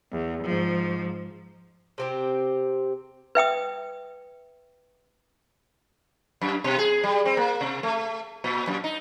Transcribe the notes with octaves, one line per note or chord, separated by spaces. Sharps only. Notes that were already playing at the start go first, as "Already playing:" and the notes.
E2
G#2 F3
C3 C4 G4
B4 E5 G5 D#6
F#2
B2
G#4
G3
C4
A#3
C3
A3
A#2
F#2
D#4